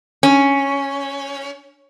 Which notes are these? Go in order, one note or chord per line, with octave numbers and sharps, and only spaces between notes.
C#4